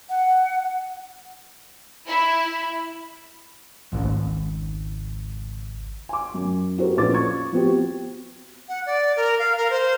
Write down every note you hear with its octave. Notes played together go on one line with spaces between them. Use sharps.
F#5
E4
G#1 C#2
G#5 D6
F#2
E4 F#4 G4 A4 A#4 C5
A#1 C#4 B4 D6 A6
C#6 G#6
F3 B3 C4 F#4 G4
F#5
D5
A#4
F5
A#4
C5